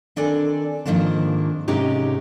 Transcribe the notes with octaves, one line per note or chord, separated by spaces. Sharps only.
D#3 C4 D4 A4 D5 G#5
G#2 D#3 F3 A#3 C4 D4
G#2 C3 G#3 C#4 D#4 G4